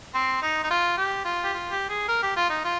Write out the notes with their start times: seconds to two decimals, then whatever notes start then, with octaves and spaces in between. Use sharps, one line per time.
0.14 C4
0.42 D#4
0.63 D#4
0.70 F4
0.97 G4
1.25 F4
1.44 G4
1.53 F4
1.71 G4
1.89 G#4
2.08 A#4
2.22 G4
2.36 F4
2.50 D#4
2.64 F4